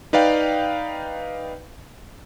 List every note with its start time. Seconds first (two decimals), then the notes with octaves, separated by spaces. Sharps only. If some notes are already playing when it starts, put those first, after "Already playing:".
0.13 D#4 B4 D5 F5 G5